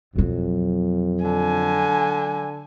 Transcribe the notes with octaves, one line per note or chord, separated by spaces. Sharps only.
F2 B2 F#3
D3 G#5